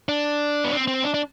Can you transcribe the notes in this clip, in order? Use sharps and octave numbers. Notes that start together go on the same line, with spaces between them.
D4
B3
C4
C4
D4
D4